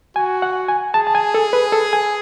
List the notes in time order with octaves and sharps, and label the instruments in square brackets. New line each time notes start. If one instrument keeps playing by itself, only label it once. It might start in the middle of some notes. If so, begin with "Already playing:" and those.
[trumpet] F#4 [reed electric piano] G#5
[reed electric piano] F#5
G#5
[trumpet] G#4 [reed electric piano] A5
[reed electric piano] A5
G#5
A4
B4
A4
G#5